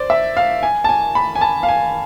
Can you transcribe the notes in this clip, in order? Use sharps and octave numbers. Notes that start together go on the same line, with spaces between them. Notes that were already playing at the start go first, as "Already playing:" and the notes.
Already playing: C5 D5
E5
F5
G#5
A5
G#5
B5
G#5
A5
F5
G#5